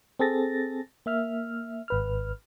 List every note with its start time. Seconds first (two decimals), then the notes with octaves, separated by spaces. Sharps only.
0.19 C4 G#4 A4 A6 A#6
1.06 A#3 E5 F6
1.88 G#1 B4 F6